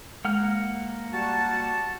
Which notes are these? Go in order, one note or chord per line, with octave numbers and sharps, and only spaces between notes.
G#3 A#3 F#5 F6
G3 F#4 A5